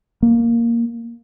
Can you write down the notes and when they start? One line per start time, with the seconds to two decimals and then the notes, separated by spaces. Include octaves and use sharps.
0.23 A#3